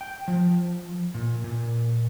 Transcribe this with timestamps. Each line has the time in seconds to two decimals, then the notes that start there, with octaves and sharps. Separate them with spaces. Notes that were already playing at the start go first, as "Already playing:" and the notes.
0.01 G5
0.28 F3
1.14 A#2
1.44 A#2